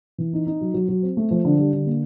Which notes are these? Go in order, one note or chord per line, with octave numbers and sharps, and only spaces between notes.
E3
D#4
D#4
F#3
F#3
F#3
C4
A3
F3
D3
G3
D3
A#3